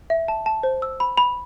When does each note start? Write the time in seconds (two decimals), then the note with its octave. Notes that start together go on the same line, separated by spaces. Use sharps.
0.10 E5
0.28 A5
0.46 A5
0.63 C5
0.82 E6
1.00 B5
1.17 B5